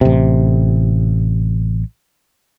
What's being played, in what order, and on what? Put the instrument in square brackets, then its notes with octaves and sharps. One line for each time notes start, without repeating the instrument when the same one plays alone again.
[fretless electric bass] A1 C3